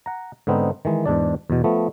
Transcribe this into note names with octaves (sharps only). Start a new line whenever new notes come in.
F#5 A#5
G#2 D3 B3 C4 D#4
D#3 E3 G#3
E2 G#2 D4 D5
E2 B2
F3 A3 B3